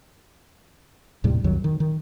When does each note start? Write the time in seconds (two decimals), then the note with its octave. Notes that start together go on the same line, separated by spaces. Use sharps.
1.24 D#2 A2 C3 G3
1.44 C2 F2 D#3 F#3
1.64 D#3
1.80 D#3